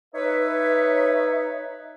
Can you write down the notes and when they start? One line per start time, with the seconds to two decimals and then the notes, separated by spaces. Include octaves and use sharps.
0.14 D#4 B4 C#5 E5